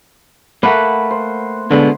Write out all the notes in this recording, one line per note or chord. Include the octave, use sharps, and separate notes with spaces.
A3 A#3 B4 F#5 B5
C5
B2 D3 G#3 B3